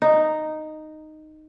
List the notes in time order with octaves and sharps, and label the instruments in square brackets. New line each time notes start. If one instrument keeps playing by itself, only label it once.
[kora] D#4